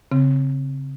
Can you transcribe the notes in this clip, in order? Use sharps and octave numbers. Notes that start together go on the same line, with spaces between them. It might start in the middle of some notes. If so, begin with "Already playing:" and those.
C#3 C4